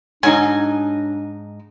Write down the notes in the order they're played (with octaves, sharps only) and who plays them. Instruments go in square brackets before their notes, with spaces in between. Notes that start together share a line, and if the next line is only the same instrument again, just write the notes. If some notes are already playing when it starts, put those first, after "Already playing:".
[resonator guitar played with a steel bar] G#2 D#4 [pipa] F#3 G#5 [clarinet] D4